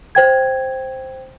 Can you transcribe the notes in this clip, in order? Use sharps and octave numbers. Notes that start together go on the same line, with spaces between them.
C5 G5 G#6